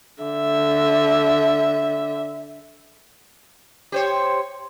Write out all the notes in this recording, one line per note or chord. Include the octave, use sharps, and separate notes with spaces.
D3 E5
G4 C5 C#5